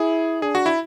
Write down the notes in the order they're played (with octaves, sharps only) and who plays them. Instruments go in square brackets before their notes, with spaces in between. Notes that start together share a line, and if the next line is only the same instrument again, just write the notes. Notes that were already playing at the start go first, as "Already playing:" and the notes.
Already playing: [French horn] E4 [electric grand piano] G#4
[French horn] D4 [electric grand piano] G#4
[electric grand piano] F#4
E4